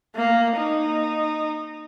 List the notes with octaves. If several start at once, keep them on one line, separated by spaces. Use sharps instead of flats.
A#3
D#4